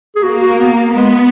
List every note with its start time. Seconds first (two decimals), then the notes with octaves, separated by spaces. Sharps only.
0.16 G#4
0.22 A#3 F#4
0.41 F#4
0.59 B3
0.93 G#3 B3